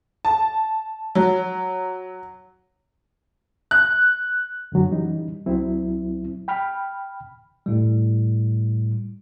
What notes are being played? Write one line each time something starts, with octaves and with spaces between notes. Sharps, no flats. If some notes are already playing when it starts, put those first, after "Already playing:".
A5
F#3
F#6
F#2 D3 F#3
E3 G3 C#4 D#4
C2 F#3 C4 E4
G5 B5 F6
A2 G3